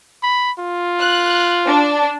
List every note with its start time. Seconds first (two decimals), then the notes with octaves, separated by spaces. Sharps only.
0.23 B5
0.59 F4
0.99 F#6
1.66 D4